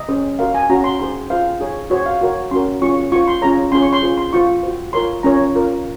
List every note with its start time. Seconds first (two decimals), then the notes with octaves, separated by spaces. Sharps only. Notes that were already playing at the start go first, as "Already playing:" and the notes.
Already playing: D#5
0.09 C#4 G#4 C5
0.39 F#4 A#4 C#5 F5
0.54 G#5
0.69 C#4 F#4 C#5 A#5
0.84 C6
0.99 D#4 G#4 C5 C6
1.30 F4 G#4 C5 F5
1.60 D#4 G#4 C#5
1.90 F#4 C5 C#5
2.06 F5
2.21 F#4 A#4 C#5
2.51 C#4 F#4 A#4 C6
2.82 C#4 F4 G#4 C#5 C#6
3.12 F4 C5 C#6
3.28 C6
3.42 C#4 F4 G#4 C#5 A#5
3.72 C#4 F4 G#4 C#5 C6
3.82 C#6
3.93 C6
4.03 F4 G#4 C5
4.18 C6
4.33 F4 C5 C#6
4.63 F#4 C5
4.93 F4 A#4 C#5 C6
5.23 C#4 F4 A#4 C#5 A#5
5.54 F4 A#4 C#5